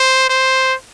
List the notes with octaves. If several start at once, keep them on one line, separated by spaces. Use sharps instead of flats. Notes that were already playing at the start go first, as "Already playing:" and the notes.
Already playing: C5
C5